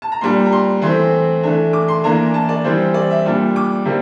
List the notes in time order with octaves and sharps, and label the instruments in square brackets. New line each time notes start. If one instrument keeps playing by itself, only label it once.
[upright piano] A5
A#5
A#2 G3 D4 C6
A#5
C6
E3 A3 C4 C6
E3 A3 D4
D6
C6
E3 A#3 D4 A#5
A5
D5
E3 G3 C4 C5
D5
E5
A#2 G3 D4
D6
C3 G3 A#3